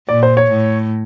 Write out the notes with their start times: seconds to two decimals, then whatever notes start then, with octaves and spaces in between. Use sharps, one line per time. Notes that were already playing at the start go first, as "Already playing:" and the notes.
0.09 A#2 D5
0.23 C5
0.37 C#5
0.51 A2